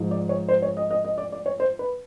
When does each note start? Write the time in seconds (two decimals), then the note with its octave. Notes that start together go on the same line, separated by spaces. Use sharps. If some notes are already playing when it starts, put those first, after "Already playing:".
Already playing: G#2 F3
0.11 D5
0.29 C#5
0.49 C5
0.62 C#5
0.77 D#5
0.91 D#5
1.05 D#5
1.18 D5
1.32 D5
1.46 C#5
1.60 C5
1.79 B4